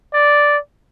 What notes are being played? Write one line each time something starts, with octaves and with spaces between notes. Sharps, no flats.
D5